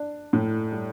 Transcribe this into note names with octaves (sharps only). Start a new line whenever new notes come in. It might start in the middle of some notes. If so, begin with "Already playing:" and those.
Already playing: D4
A2
G3